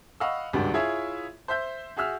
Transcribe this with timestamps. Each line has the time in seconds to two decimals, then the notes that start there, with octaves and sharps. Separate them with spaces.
0.20 D#5 F5 F#5 B5 C#6 E6
0.53 G#1 C#2 G2 D4 F#4 G4
0.74 E4 F4 G#4 C#5 E5
1.48 C5 E5 G6
1.97 F#4 G#4 E5 E6 F6